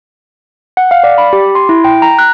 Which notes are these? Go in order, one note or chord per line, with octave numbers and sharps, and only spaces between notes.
F#5
F5
D5
B5
G4
C6
E4
G5
A#5
F#6